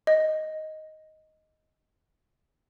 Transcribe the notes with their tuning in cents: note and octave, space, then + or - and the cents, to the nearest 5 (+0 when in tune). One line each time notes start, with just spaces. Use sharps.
D#5 +5